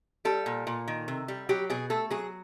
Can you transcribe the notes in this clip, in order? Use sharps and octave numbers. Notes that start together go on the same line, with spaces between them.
G3 A4
A#2
A#2
D#3
C3
G3
F#3 G4
B2 G#4
A3 A4
F#3 G#4